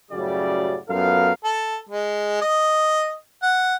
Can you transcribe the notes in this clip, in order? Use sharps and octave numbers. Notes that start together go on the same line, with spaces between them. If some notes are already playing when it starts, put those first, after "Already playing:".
F#2 A2 C#3 G3 F#4 D5
F#2 B3 F4 A4 A#4 F5
A4
G#3
D#5
F#5